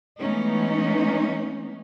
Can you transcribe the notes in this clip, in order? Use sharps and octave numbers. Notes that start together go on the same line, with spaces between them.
E3 G#3 A3 B3 C#4 D#4